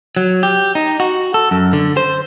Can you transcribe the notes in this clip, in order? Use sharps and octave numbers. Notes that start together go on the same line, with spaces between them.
F#3
G4
D#4
F#4
A4
F#2
D3
C5